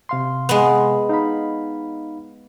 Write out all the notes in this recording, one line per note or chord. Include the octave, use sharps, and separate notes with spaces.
C3 F5 C6
G#3 B3
D#4 F5 B5